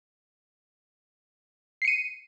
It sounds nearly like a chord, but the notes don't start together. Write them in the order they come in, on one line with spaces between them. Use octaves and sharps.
C7 C#7 D#7